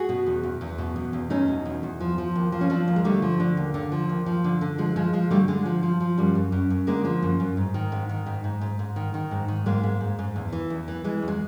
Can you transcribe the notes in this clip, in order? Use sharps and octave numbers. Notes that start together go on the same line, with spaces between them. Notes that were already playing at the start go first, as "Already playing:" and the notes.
Already playing: F#4 G#4
B2
E2
E2
E2
B2
E2
E2
E2 C#4 D#4
B2
E2
E2
F3
F3
D#2
F3
C#4
F3 C4 D4
D#2
G#3
D3 G3 A3
F3
D3
D#2
D3
F3
D#2
F3
D3
D3
F3 G#3
F3 G#3
F3 G#3
D3 G3 A3
D3 G#3
F3
F3
F3
F#2 G3
F#2
F#2
F#2
D3 G#3 A#3
F3
F#2
F#2
G#2
D#3
G#2
D#3
G#2
G#2
G#2
G#2
D#3
D#3
G#2
D#3
G#2 G#3 A#3
G#2
G#2
G#2
E2
E3
E2
E3
E3 G#3
E2
G#3